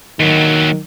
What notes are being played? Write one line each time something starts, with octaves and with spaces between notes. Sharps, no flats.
D#2 D#3 F#3